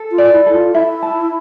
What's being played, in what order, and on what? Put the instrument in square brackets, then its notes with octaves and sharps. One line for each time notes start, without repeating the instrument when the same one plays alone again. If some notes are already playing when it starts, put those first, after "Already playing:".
Already playing: [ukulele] A4
[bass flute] F4
[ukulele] D5
[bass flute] E4
[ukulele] A4
[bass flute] F4
[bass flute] E4 [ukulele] E5
[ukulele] A5